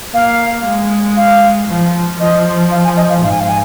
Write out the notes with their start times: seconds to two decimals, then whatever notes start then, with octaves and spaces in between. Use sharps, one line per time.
0.14 A#3 F5
0.66 G#3
1.17 F5
1.68 F3
2.20 F3 D#5
2.71 F5
2.84 G#5
2.97 D#5
3.10 F5
3.22 G#2 F5
3.31 G#5
3.41 F5
3.49 G#5